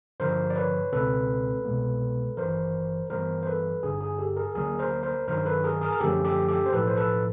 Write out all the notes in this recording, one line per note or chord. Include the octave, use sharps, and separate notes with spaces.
G2 D3 F3 A#4 C5
D5
B4 C#5
C#2 B2 G#3 C4 A4 B4
C2 B2 G#3 B3
G#1 G2 E3 A#4 C5
G2 E3 G3 B3 A#4 C5
C5
A4 B4
G1 G2 D3 G#4
G#4
G4 A4
G#4 A#4
D2 D3 F#3 A#3 G#4 A#4
A#4 C5
A#4 C5
G2 D#3 F#3 A#4 C5
A4 B4
G#4 A#4
G#4 A#4
A#4
F#2 D3 F3 A3 C#4 G4 A4
G4 A4
G4 A4
C5
B1 A2 F3 A4 B4
C5
A4 B4